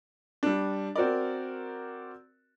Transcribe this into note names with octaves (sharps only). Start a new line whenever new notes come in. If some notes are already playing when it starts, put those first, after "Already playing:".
G3 D4
C4 F#4 A#4 D5